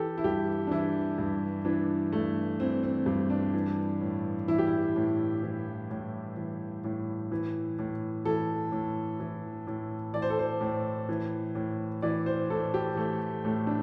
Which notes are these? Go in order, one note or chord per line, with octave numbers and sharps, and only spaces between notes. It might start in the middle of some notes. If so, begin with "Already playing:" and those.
Already playing: E3 G4 A4
E4
G2 G4
D4
E3 E4
G2
E3 D4
G2 A3
E3 C4
C4
G2
D4
E3
A2
E3 E4
G4
E4
A2
E3
A2
E3
A2
E3
A2
E3 A4
A2
E3
A2
E3 D5
C5
A4
C5
A2
E3
A2
E3 D5
C5
A2 A4
G4
E3 A3
A2 A3
D4